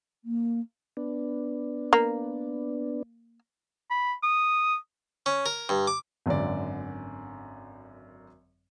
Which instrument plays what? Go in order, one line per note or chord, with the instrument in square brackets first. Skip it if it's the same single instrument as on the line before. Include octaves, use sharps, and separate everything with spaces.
[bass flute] A#3
[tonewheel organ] B3 D4
[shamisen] A#3
[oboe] B5
D#6
[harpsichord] C#4
A#4
G2
D6
[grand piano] G#1 F#2 D3 D5